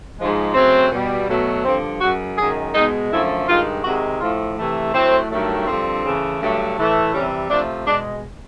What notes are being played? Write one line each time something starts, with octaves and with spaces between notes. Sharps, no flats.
G#2 F3 G#3
C#3 F#3 A3 C4
B2 G3
B2 F#3 A3
G2 D3 F3 C4
F#2 C#3 F#3 F#4
F#2 D#3 G#3 G#4
B2 G#3 D#4
F#2 D3 F3 A3 E4
G2 D#3 G#3 F4
C3 D#3 G#3 F#4
A2 F3 A3 F4
C3 E3 A3
A2 F#3 A3 C4
G2 D#3 F#3 A3
G2 D3 F3 C4
C#3 E3 A3
G2 D3 F#3 A3
A2 E3 A3
C3 E3 G3 C#4
C3 F3 A3 D4
B2 G#3 D4